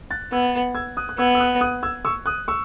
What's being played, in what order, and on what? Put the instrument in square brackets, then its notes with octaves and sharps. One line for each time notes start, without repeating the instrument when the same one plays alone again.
[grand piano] F#6 A6
[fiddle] B3 [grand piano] E6 G#6
[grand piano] E6 G#6
D#6 F#6
F#6
[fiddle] B3 [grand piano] E6 G#6
[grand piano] E6
D#6 F#6
D#6 F#6
E6 G#6
C#6 E6
D#6 F#6
C#6 E6